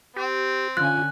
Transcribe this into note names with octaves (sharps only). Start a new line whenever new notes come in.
C4 G4
D3 C#4 F4 G#5 F#6